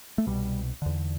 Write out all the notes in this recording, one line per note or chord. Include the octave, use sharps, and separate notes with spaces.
A3
C2 B2 G3
E2 D3